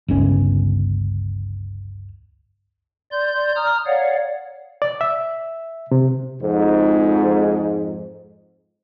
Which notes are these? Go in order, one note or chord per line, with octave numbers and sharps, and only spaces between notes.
G1 C#2 C#4
D5 C6 G6
A#5 D#6 F6
C#5 D5 F5 F#5
D5
E5
C3
F2 G#2